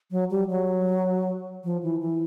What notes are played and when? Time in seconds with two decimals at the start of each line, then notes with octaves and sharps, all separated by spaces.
0.11 F#3
0.31 G3
0.50 F#3
1.64 F3
1.83 E3
2.01 E3